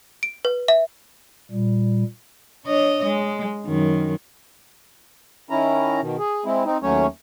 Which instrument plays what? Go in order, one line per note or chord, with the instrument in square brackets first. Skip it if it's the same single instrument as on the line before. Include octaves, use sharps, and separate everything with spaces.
[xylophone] D7
B4
E5
[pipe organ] A#2 G3
[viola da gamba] D4 C#5 D#5
G#3
F#2 D#3
[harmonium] D#3 C#4 E4 A#5
B2 D#3
G#4
G#3 C4 E4
C4 D#4
D#2 F#3 A3 C#4 C#5